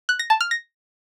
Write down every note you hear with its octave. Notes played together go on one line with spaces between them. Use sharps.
F#6
A#6
A5
F6
A#6